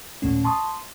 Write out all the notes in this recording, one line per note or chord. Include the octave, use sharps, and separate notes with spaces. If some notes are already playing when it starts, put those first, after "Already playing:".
D#2 A#2 A3 C#4
A5 C6 C#6 D#6